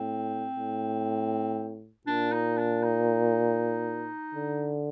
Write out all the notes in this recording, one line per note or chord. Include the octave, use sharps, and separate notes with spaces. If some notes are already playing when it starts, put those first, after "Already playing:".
Already playing: A2 C4
A2
A#2 D4
D#4
D4
D#4
D3